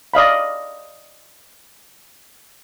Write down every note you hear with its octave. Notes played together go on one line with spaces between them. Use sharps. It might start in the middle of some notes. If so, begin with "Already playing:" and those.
D5 D#5 F5 B5